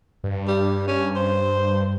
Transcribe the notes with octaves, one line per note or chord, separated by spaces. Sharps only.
G2
G3
C#4
C5